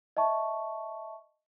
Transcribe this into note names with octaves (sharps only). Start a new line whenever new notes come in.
D#5 E5 A5 C#6